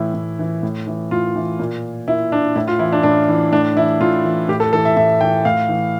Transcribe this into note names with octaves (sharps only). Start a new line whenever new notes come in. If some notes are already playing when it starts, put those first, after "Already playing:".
Already playing: A2 E3 E4
A2
E3
A2
E3
A2 F4
E3
A#2
A#2 E4
D4
A2 E4
F4
E3 E4
D4
A2 D4
E3
A2 D4
E3 E4
A2 F4
E3
A2 G4
A4
E3 A4
E5
A2 E5
E3 G5
A2 F5
E3